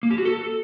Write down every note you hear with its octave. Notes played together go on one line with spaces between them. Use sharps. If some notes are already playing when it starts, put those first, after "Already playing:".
A#3
G4
F#4
A4